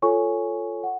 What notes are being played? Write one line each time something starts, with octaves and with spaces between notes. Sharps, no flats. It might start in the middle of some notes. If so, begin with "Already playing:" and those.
F4 A4 C#5 G#5 C#6
F#5